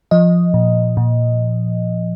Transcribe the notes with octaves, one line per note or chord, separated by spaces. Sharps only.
F3 D#5
A#2
A#2